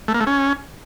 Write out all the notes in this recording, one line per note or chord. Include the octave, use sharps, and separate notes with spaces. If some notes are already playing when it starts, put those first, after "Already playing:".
A3
A#3
A3
C#4